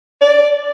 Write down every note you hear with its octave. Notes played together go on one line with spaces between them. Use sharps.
D5